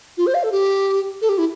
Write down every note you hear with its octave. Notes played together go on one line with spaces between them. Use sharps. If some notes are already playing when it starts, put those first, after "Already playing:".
F4
C5
F5
A4
G4
A4
G4
E4